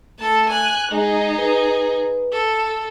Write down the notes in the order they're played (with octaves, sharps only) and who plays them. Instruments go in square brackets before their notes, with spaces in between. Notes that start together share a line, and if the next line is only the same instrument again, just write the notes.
[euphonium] A3 [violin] A4 A5
[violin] G#5 F#6
[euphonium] G#3 [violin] D#4 G#4
[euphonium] B4
[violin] A4